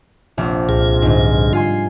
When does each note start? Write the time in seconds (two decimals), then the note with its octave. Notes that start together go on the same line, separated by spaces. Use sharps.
0.37 F1 A#1
0.69 C2 A#2 G#4
1.02 G1 G#2
1.53 F4 G#5 C6